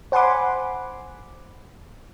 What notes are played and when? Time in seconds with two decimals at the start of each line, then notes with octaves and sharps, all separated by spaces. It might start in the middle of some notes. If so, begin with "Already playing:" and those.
0.12 C5 F#5 G#5 B5 C6 D6